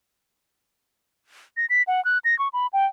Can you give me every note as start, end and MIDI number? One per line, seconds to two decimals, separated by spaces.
1.57 1.66 94
1.70 1.83 95
1.87 2.03 78
2.05 2.18 90
2.25 2.37 94
2.39 2.48 85
2.53 2.67 83
2.73 2.86 79